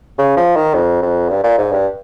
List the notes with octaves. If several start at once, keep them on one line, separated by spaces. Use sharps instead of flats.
C#3
F3
D#3
F2
F2
G2
A#2
G#2
G2